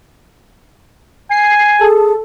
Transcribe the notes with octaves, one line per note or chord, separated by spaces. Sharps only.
G#5 C7
G#4 A4